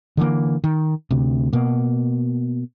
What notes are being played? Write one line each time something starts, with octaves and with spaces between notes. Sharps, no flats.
D3 E3 A#3
D#3
D2 C3
B2 A#3